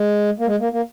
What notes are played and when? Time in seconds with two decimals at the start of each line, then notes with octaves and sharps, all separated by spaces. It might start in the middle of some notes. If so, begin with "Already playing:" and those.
Already playing: G#3
0.39 A#3
0.47 G#3
0.60 A#3
0.72 A#3